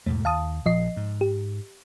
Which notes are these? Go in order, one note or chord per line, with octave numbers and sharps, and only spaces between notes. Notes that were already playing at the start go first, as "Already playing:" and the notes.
E2 G#2 B2 A3
D#2 F5 A5 D#6
A#1 F3 D#5 C7
G#2
G4